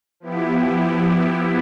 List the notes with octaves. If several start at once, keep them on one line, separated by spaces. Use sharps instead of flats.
F3 B3 E4 G4